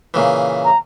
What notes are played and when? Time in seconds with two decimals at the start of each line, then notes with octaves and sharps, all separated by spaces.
0.14 A#2 C#3 E3
0.65 A#5